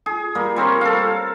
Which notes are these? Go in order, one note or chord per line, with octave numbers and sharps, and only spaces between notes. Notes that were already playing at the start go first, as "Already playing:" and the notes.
G#4
G3 A#3
G3 C4 A#4 C#5
A4 F5